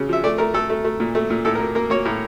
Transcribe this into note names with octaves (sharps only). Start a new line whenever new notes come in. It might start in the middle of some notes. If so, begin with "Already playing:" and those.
Already playing: C#3
F3 E5
A3 D5
A3 A#4
A3 A4
A3
A3
A#2
A3
A#2
A2 A4
A#4
A#3
A#3 A#4
A#3 C#5
A2 A#4